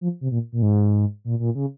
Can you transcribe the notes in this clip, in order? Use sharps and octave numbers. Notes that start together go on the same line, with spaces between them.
F3
C3
A#2
A#2
G#2
A#2
A#2
C#3